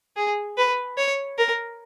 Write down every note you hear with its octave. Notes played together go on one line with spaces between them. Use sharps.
G#4
B4
C#5
A#4